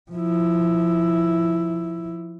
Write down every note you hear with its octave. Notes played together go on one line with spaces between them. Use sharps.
F3 E4